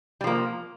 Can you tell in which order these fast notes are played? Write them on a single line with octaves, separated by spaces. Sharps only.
G3 F3 A#3